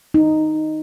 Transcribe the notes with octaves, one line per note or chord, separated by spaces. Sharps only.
D#4